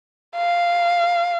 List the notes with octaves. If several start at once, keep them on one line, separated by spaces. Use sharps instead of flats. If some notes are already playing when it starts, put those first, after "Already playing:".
F5